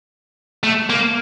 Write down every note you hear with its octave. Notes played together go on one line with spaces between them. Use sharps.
A3
A#3